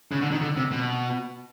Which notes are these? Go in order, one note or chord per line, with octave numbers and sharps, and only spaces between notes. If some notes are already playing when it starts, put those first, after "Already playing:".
C#3
D3
D#3
D3
C3
B2